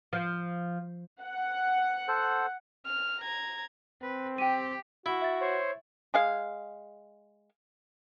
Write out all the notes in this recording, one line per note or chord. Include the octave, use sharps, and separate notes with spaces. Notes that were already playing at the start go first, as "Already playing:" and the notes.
F3
F#5
A4 C5
F6
A#5 G#6
C4 B4
G4 G5 D#7
E4 F#4
E5 A6
C5 C#5
G#3 G#4 F5